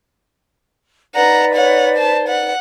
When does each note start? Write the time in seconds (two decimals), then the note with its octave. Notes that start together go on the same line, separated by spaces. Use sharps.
1.16 D#4 B4 D5 F#5 A#5
1.54 C#5 F#5
1.97 C5 A5
2.28 F#5